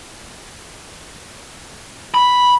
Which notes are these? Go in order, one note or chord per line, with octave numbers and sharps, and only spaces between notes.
B5